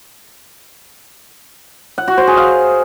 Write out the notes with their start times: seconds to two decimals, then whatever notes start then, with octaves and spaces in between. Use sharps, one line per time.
1.98 F#5
2.08 F#4
2.18 C5
2.27 G#4
2.37 F5